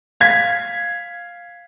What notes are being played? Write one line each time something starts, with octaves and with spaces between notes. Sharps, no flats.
F5 G#6 B6